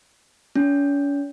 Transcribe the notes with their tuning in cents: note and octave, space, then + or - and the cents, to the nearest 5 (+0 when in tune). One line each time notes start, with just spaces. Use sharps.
C#4 +40